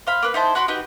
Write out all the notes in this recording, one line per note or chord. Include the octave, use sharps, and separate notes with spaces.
C5 F5 B5
A#3 B4
D#4 E4 C5 A5
F#4 B5 C6 D6
D#4 F#4 G4 B4